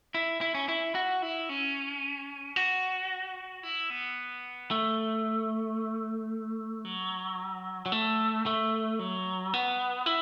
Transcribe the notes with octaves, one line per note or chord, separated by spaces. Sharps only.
E4
E4
C#4
E4
F#4
E4
C#4
F#4
E4
B3
A3
F#3
F#3
A3
A3
F#3
B3
E4